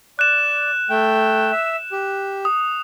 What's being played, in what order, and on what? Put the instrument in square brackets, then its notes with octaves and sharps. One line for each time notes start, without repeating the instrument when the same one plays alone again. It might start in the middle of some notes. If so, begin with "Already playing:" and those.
[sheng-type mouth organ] D5 [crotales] F#6 E7
[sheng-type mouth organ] A3 G5
E5
G4
[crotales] D#6